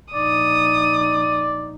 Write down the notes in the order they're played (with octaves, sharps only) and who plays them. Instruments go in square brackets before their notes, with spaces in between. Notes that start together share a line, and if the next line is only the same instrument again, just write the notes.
[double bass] A#1 D#4 [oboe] D5 [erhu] D#6